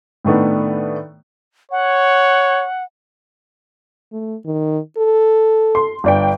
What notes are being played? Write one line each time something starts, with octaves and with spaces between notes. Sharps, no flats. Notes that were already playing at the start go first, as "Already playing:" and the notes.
A2 D#3 A3 B3 D4
C#5 F#5
A3
D#3
A4
C6
G1 D4 G5